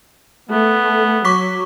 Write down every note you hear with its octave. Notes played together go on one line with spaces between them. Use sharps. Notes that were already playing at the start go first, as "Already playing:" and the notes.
A3 B3
F#3 C#6 D6 B6